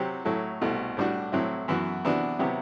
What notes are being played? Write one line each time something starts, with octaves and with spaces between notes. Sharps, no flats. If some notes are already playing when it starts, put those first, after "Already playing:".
Already playing: C3 F#3 C4 G4
A2 F#3 A3
C2 B2 A3
A2 G3 D4 F#4
A2 F#3 C4 E4
F#2 E3 B3 F#4
C3 E3 B3 D4 F#4
C3 F#3 B3 E4 G4